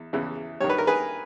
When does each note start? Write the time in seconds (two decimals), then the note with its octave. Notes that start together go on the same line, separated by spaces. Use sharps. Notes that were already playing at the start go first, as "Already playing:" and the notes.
Already playing: E2
0.13 E2 C#3 E3
0.60 G2 D#3 C#5
0.70 B4
0.78 A#4
0.87 G#4 B4